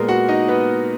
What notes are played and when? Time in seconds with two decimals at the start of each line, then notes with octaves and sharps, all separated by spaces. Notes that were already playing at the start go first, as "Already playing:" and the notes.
Already playing: A#2 G#3 B3 A#4
0.08 F#4 F#5
0.29 D#4 D#5
0.49 B3 B4